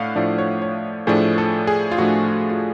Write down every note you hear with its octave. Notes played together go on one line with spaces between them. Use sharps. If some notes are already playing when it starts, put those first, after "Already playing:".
Already playing: A2 A3 D4 F5 F#5
A2 F3 A3 D4 D5
C#5
C#5
A2 F3 A3 D4 G#4
A4
G#4
F4
A2 F3 A3 D4 F#4
F#4
F4